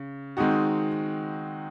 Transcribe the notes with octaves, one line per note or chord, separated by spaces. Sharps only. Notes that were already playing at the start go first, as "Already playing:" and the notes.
Already playing: C#3
D#3 G#3 C4 D#4 F#4